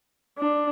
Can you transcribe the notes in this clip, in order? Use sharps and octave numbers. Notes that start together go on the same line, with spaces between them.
D4